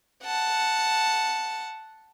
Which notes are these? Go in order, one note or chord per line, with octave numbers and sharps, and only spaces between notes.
F#5 A5